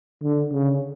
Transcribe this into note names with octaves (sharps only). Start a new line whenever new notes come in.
D3
C#3